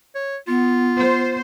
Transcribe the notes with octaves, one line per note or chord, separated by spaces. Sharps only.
C#5
B3 F4
C5